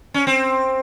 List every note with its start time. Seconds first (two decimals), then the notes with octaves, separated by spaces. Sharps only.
0.14 C#4
0.27 C4